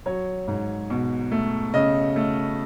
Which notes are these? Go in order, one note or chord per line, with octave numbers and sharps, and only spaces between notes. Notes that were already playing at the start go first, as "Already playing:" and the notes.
F#3 C#5
G#2
B2
A3
C#3 D#5
A3